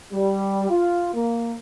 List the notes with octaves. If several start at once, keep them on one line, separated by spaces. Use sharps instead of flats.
G3
F4
A#3